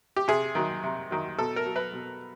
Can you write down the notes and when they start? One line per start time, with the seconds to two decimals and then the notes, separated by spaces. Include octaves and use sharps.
0.16 G4
0.28 C3 G#4
0.55 D#3 F#3
0.83 C3
1.11 D#3 F#3
1.39 B2 A4
1.56 A#4
1.66 F#3
1.76 B4
1.93 B2